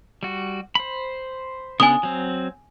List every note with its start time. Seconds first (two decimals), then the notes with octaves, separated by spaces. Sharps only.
0.23 G3 F#4
0.75 C5 B5
1.80 C#3 B3 D4 G#5 D#6
2.03 F#3 C4